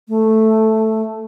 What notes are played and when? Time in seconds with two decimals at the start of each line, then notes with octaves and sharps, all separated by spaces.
0.09 A3